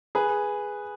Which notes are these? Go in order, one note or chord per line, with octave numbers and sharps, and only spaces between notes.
G#4 B4